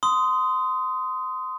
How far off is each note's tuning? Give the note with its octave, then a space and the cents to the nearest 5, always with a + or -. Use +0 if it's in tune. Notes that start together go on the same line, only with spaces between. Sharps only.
C6 -20 D#6 +5